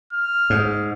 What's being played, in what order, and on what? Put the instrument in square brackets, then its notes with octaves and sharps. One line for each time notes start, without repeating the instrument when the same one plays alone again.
[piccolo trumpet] F6
[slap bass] G#2